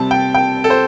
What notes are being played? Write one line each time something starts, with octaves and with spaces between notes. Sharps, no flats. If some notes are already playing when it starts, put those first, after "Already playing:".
Already playing: C3 G3 C4 A5
G5
G5
A4
C5